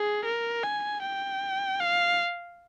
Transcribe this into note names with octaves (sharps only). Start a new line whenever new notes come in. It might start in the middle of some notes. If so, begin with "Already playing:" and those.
Already playing: G#4
A#4
G#5
G5
F5